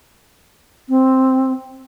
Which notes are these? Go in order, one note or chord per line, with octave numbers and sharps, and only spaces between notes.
C4